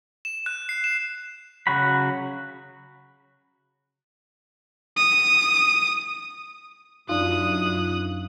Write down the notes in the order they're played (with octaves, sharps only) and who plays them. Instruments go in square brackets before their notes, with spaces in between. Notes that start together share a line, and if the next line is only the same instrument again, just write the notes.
[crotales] E7
F#6
C7
E7
[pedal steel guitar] C#3 F#3 F#4 F#5 B5
[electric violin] D#6
[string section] F#2 [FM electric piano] D4 F4 [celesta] D#4 [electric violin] D#6 F#6